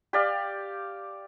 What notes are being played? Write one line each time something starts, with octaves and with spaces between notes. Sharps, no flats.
G4 D5 F5